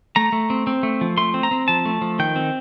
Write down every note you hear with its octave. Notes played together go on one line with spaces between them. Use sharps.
A3 A#5
A3
C4
C4
A3
F3
A3 C6
C4
A#5
C4
F3 A5
A3
F3
D#3 G5
C4